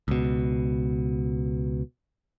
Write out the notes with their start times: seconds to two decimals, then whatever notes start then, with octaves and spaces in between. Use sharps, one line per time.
0.08 C#2 B2